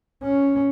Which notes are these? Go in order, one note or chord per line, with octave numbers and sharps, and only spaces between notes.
C#4